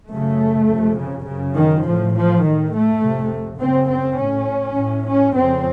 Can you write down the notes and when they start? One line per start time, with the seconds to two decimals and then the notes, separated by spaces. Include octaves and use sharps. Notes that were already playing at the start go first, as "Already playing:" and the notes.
0.09 F#2 C#3 A3
0.68 F2 C3
0.97 C#3
1.26 F#2 C#3
1.55 D#3
1.84 A2 F3
2.14 F3
2.42 A2 D#3
2.72 A3
3.01 F2 C3
3.59 F#2 C#3 C4
3.88 C4
4.17 A2 C#4
4.76 A2
5.05 C#4
5.34 F2 C#3 C4